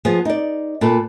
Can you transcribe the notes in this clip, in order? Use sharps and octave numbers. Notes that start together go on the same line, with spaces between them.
F3 B3 G#4
D#4 D5
A#2 A4 B4